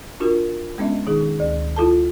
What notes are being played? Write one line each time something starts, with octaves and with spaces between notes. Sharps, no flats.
D4 F4 F#4 A#4
G#3 B3 C#4 D4 D#5 E5
B2 D#3 D#4 G#4
D2
E4 F4 A4 A5